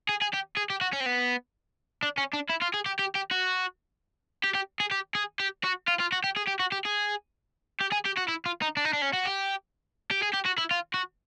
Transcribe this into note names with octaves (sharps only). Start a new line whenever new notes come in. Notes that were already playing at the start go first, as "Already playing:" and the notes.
G#4
G#4
G4
G#4
G4
F#4
C#4
C4
B3
D4
C#4
D4
E4
F4
G#4
G4
G4
G4
F#4
G4
G4
G#4
G4
G#4
G4
F#4
F4
F4
F#4
G4
G#4
G4
F#4
G4
G#4
G4
G#4
G4
F#4
E4
F4
D#4
D4
D#4
D4
C#4
F#4
G4
G4
G#4
G4
F#4
E4
F4
F#4